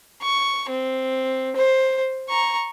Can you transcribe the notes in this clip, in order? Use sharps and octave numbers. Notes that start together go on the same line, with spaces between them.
C#6
C4
C5
A#5 C#6